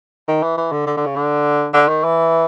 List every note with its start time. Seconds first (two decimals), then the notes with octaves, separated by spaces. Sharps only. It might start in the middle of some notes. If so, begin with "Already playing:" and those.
0.28 D#3
0.43 E3
0.57 E3
0.72 D3
0.87 D3
0.97 D3
1.06 C#3
1.16 D3
1.74 D3
1.88 D#3
2.04 E3